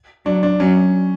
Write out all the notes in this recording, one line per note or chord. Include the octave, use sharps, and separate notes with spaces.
F#3 D4
D4
F#3 C#4